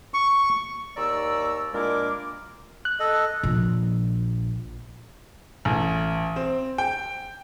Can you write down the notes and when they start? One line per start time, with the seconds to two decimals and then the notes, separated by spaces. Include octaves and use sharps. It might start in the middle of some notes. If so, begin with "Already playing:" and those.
0.14 C#6
0.97 D#2 D5 A#5 C#6 E6
1.74 A#2 G#3 D4 E4 A#4 D6
2.85 F#6
3.00 A4 D#5
3.43 A#1
5.65 A1
6.36 C4
6.78 G5